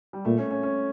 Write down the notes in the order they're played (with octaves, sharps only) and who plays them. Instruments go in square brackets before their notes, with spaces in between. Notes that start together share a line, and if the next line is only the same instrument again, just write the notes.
[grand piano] G3
[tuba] A#2 [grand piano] A3
[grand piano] C#4
C#4
C#4